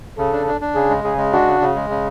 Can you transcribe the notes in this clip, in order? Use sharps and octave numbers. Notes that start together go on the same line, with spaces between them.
C#3 A4
D4
D4
D4
C#3 G#4
G#3
C#3 G#4
G#3
D4 F#4
C#3
C#3
G#3
C#3